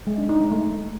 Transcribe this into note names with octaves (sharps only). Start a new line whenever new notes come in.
G#3
D4
D#4
G#3
A3